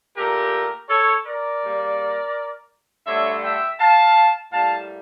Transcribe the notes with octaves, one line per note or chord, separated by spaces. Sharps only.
A#2 A3 G4 A#4
A4 C#5
A#4 D5
C#3 G3 A#3
G2 D3 A3 C#5 E5
E5 G5
F5 A5
A2 G3 A#3 F5 A5